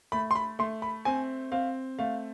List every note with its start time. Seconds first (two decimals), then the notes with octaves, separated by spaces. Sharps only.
0.12 A3 B5
0.31 C6
0.35 B5
0.59 A3 C6
0.82 B5
1.05 C4 G#5
1.52 C4 F5
1.99 A3 F5